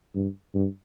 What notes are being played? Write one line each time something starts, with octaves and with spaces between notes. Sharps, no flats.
G2
G2